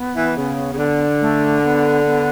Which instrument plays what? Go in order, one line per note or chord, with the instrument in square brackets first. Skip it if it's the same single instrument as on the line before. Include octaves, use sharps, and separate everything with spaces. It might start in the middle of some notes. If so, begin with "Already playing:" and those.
Already playing: [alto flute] B3
[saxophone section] E3
C#3
C#3
D3
[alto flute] A3
B3
B3